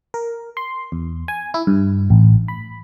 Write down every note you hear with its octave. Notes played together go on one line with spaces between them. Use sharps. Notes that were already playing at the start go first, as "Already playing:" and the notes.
A#4
C6
E2
G#5
E4
G2
A1
B5